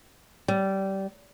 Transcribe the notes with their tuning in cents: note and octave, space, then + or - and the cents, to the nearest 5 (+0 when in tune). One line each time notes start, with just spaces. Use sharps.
G3 -20